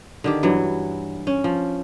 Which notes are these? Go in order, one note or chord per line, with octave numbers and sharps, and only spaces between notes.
D3 D#3 G4
G2 E3 F#3
C#4
F3